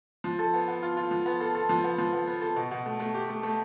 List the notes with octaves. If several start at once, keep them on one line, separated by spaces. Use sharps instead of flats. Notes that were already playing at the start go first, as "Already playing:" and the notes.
F3
A4
B3
B3
F4
F4
F3
B3
A4
A4
F3
B3
F3
B3
B3
A4
B2
B2
A3
A3
G4
A3
A3